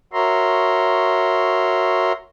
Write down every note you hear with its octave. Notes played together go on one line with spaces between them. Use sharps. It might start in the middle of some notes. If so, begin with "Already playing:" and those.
F#4 A#4 C#5 E5 A#5 C6